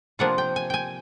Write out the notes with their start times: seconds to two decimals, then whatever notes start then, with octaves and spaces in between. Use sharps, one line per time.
0.19 C3 F3 A#3 D4 F4 F#5
0.38 G5
0.56 G#5
0.70 G5 G#5